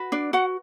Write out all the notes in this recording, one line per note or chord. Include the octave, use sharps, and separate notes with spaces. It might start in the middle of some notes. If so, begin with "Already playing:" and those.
Already playing: F#4 B4
D4 D5
F#4 F#5